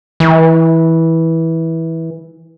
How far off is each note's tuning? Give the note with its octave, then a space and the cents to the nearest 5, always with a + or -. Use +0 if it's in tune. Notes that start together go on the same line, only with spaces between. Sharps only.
E3 -15